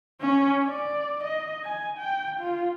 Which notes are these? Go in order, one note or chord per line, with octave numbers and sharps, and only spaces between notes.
C#4
D5
D#5
G#5
G5
F4